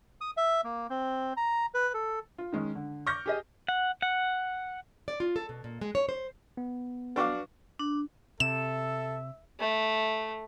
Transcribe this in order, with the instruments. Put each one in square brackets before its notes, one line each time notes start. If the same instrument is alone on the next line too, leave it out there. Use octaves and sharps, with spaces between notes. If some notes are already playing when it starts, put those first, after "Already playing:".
[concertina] D#6
E5
A#3
C4
A#5
B4
A4
[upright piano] F4
D#3 G#3 C#4
D3
C#6 D6 F6 G6 A#6
G4 G#4 D#5
[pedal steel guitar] F#5
F#5
[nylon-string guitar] D5
F4
A4
B2
A#2
G#3
C#5
C5
[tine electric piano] B3
[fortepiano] D4 F#4 F5 [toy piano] B4 C#6 D6
[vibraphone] D4
[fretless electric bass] C3 [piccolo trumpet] A4 [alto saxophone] E5 [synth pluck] E7
[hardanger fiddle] A3